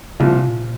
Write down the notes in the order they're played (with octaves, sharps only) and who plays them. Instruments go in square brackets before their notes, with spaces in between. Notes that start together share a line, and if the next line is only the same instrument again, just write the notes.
[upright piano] C2 A#2 F3 [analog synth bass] C#3
[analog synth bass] C3
A#2